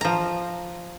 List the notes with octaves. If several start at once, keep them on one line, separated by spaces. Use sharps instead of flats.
F3 A#5